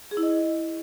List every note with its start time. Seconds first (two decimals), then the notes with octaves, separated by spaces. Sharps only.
0.11 G#4
0.17 E4
0.23 D#5